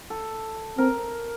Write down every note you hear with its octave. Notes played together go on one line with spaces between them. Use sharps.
A4
C4 A#4